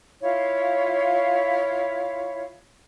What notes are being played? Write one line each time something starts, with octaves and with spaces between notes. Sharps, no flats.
E4 F4 C#5 F5